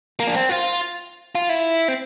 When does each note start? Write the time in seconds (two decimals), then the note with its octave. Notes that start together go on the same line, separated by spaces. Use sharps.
0.20 A#3
0.27 D4
0.35 C4
0.49 F4
1.35 F4
1.49 E4
1.88 C4